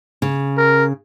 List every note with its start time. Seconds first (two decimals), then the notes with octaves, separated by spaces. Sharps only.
0.22 C#3
0.57 A#4